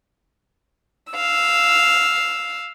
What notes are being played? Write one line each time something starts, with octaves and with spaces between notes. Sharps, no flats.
F5 E6